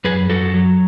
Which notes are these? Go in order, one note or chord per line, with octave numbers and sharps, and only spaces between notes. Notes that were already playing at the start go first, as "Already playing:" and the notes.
F#2 G#4 B4
F#2 F#4 A4
F#3